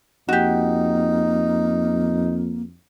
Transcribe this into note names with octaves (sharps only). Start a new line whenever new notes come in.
F2 A#3 D#4 F#4 G4